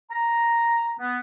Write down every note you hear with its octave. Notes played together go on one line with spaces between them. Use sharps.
A#5
B3